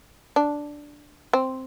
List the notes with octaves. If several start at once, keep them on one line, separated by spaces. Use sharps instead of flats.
D4
C4